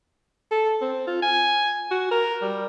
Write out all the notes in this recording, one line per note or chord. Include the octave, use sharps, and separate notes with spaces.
A4
C4
F4
G#5
F#4
A#4
G3